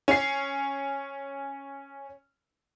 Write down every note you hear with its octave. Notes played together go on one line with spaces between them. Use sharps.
C#4 C7